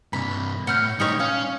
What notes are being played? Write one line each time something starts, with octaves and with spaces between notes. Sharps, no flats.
G2 C3 B5
A2 F#5 F6 G6
A2 G3 D#4 G4 C#5
C#4 F5